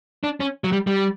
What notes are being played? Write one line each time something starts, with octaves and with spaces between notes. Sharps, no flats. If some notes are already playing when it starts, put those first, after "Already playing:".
D4
C#4
F#3
G3
G3